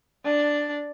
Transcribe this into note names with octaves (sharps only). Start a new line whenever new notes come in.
D4